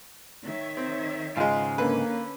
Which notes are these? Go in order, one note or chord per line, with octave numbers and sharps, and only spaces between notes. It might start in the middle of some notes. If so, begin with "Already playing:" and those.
D#3 C#5 E5
C4
G#2 C#3 G#3 F4
D3 A#3 C#4 B4